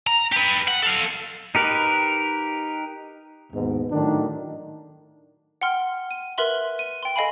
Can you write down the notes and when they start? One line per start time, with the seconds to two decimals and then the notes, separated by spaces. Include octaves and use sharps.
0.07 A#5
0.32 G4 B4
0.68 F#5
0.83 A4 F5
1.55 D#4 G4 A#4 B4
3.52 D#2 G#2 B2
3.91 A2 D#3 F#3 D4 D#4
5.62 F#5 G5 C6 F6
6.11 D#7
6.38 A#4 B4 E5 C6 F#7
6.79 D#7
7.03 G5 C6
7.16 A4 D#5 F5 G#5 B5